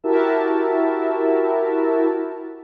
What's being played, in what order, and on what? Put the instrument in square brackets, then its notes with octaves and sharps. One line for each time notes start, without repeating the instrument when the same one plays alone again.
[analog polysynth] E4 F#4 G4 A#4 E5 A5